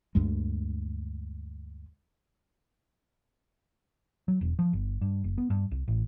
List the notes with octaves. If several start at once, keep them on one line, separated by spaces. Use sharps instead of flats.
D2 G2 G#3
F#3
E1
F3
G1
G2
F#1
B3
G2
C2
A1